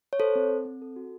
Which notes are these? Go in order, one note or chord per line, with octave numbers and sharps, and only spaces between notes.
C#5
A4 C5
C4
C4
C4
A4
F#4